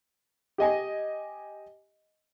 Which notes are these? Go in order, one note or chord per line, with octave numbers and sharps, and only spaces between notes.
G4 D#5 G#5